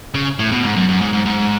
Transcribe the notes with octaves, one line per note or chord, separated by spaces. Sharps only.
C#3
A2
B2
G#2
F#2
F#2
G#2
G#2
G#2